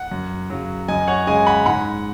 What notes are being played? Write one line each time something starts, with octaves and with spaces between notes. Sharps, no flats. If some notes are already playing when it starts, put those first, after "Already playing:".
Already playing: F#5
F#2
C#3 F#3
F#2 D#5 G#5
C#5 F#5
C#3 G#3 D#5 G#5
F#5 B5
G#2 F#5 B5